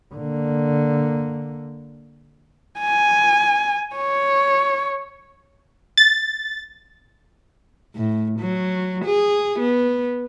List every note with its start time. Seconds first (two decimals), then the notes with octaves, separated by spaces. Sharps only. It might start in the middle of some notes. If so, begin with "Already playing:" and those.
0.14 D3 A#3
2.80 G#5
3.96 C#5
5.97 A6
7.95 A2
8.39 F#3
9.05 G#4
9.60 B3